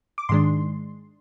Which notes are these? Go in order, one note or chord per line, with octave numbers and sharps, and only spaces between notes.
D6
G#2 D#3 G#3 D4 C6